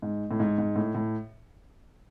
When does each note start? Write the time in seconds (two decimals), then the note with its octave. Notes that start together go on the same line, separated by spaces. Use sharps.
0.02 G#2
0.31 A2
0.40 G#2
0.58 G#2
0.76 A2
0.95 A2